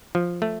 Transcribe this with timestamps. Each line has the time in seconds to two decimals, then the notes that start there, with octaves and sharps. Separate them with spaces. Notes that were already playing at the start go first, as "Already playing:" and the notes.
0.15 F3
0.42 A3